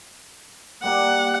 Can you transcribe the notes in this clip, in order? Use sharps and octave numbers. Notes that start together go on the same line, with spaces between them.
G3 A#3 G4 F#5